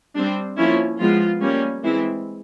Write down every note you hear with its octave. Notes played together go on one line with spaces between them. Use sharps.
G3 C4 D4
F3 A#3 C#4 E4
F3 G#3 B3 F4
G3 A#3 C#4
E3 G#3 C4 E4